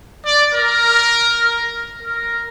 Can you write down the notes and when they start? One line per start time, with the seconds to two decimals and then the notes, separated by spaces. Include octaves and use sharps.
0.24 D5
0.53 A#4
2.03 A#4